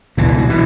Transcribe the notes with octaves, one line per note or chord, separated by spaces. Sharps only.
C#2 B2 E3
E3
F#3
B2 E3